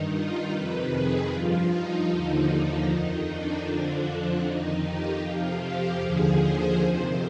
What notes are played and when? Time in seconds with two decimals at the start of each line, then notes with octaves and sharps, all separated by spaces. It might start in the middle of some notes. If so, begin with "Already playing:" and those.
Already playing: G2 D#3 D#4
0.11 F4
0.50 F2 C3 D#3 B4
0.89 G#4
1.29 G2 F3 F4
1.68 D#4
2.07 D#2 D3 F3 D#4
2.86 F2 D#3
3.25 D4
3.64 F2 D3 F3
4.43 F2 D#3 D#4
4.82 G4
5.22 F2 C3 F3 F4
5.60 G4
6.00 D#2 D3 F3 G#4
6.39 C5
6.78 F2 C3 D#3 C5